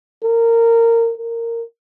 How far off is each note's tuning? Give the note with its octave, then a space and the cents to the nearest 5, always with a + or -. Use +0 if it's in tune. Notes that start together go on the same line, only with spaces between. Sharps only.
A#4 -15
A#4 -15